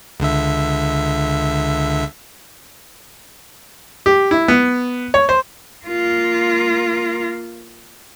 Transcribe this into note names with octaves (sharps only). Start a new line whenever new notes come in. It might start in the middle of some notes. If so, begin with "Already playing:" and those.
C#2 D3 E5
G4
E4
B3
C#5
C5
A#3 F4